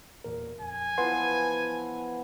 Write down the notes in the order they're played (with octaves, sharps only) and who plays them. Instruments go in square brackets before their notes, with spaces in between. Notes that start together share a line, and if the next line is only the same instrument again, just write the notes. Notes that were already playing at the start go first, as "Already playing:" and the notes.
[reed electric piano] E2 A#2 A#4
[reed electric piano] F2 [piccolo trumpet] G#5
[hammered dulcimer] E3 F3 B3 [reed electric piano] B4 F#5 C6